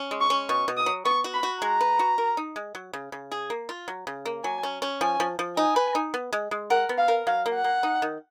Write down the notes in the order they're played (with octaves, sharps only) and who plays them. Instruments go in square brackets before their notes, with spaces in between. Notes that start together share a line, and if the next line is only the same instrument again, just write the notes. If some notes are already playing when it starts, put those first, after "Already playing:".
Already playing: [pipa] C#4
G#3
[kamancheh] C#6
[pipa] C#4
[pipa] B2 [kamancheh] C#6
[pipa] B2
[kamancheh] D#6
[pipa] F#3
[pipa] B3 [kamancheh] C#6
[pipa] F#4
[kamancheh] B5
[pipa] F#4
[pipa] G#3 [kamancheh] A#5
[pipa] B4
F#4
A#4
D#4
G#3
F#3
C#3
C#3
G#4
A#3
F4
F#3
C#3
A#3
[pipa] F#3 [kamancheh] G#5
[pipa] C#4
C#4
[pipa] F3 [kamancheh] G#5
[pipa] F3
F3
[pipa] D#4 [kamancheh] G#5
[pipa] B4
D#4
B3
G#3
G#3
[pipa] A#4 [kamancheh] F#5
[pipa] B3
[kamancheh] F5
[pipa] A#4
[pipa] F#3 [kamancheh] F5
[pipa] A#3
[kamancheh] F#5
[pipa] A#3
D#4
D#3